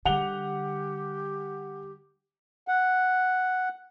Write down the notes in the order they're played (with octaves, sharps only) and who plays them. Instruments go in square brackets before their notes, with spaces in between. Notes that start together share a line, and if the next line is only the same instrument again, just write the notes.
[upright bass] D3 G3 [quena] G4 [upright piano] F#5 F7 G7
[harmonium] F#5